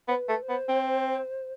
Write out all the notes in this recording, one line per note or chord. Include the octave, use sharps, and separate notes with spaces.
B3 C5
B4
A3
C5
B3
C4